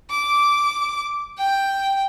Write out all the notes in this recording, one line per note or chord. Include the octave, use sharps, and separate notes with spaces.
D6
G5